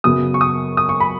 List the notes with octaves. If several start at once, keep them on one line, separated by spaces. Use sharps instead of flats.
F#2 C#3 F#3 B3 D#6
C#6
D#6
D#6
C#6
B5